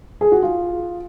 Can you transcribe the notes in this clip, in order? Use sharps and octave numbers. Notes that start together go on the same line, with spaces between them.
G#4
F#4
F4